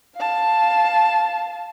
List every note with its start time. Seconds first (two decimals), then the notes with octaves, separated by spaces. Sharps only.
0.16 F5 A5